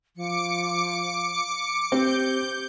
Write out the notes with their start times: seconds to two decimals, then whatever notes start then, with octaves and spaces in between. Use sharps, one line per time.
0.16 F3 D6 C#7
1.92 C4 G4 G6